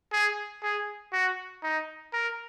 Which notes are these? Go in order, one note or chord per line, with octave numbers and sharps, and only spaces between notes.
G#4
G#4
F#4
D#4
A#4